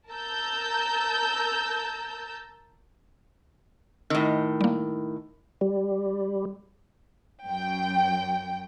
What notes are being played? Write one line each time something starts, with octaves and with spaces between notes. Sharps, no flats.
A#4 A5 A#5 E6 G6
A2 D#3 E6
G3 A#3
G3
F#2 G5